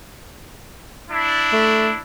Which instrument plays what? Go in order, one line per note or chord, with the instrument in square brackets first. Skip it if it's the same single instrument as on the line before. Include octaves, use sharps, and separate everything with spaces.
[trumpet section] D4 E4
[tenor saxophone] A3